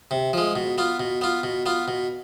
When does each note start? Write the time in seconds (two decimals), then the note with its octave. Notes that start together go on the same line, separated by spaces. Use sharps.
0.11 C3
0.33 F3 G#3
0.56 B2
0.78 B3 F4
1.00 B2
1.21 B3 F4
1.43 B2
1.66 B3 F4
1.88 B2